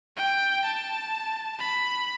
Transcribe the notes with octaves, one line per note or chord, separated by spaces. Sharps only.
G5
A5
B5